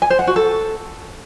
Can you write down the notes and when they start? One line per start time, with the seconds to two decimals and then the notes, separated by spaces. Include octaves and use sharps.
0.02 G#5
0.10 C5
0.19 F#5
0.27 F#4
0.36 A4